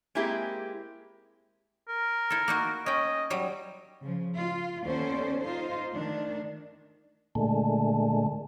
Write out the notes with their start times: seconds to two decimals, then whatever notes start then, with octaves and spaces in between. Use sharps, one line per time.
0.15 G#3 A#3 C4 E4 G4 G#4
1.89 A#4
2.30 E4 A4
2.48 A#3 D#4 F#4
2.86 C#4 D#5 G5
3.30 F#3 G3
4.02 C#3 F3
4.35 F4
4.85 D#2 B3 C#4 A4 C5 D5
5.42 D#4 F4 C5
5.92 D#3 A3 D4
7.35 A#2 D3 G#3 A3